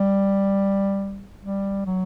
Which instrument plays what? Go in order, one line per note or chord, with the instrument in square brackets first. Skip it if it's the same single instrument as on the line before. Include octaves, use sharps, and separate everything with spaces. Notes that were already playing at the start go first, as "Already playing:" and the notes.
Already playing: [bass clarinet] G3
G3
F#3